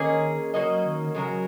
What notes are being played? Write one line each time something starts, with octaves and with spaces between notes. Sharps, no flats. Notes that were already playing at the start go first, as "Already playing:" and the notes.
Already playing: D#3 A#3 C#4 G#4 D#5
F#3 A#3 C#4 F#4 D#5
D#3
C#3 F#3 G#3 F#4 A#4